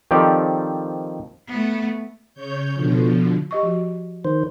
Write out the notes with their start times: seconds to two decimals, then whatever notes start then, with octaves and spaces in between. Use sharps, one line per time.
0.11 D#3 F3 C4 G4 A4 D5
1.47 A3 B3
2.34 C#3 C#5 G6
2.73 B2 D3 F3
3.51 G4 D#5 C#6
3.63 F3 F#4
4.25 D#3 C5